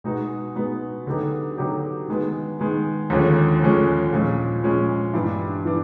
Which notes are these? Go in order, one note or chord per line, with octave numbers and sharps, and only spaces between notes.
B2 G#3 B3 D#4 F#4
B2 G#3 B3 D#4 F#4
D3 F#3 B3 D#4 G4
D3 F#3 B3 D#4 G4
D#3 G#3 B3
D#3 G#3 B3
D#2 D3 F3 G#3 C#4
D#2 D3 F3 G#3 C#4
A#2 F3 G#3 C#4
A#2 F3 G#3 C#4
G2 E3 G3 B3 D4
E3 G3 B3 D4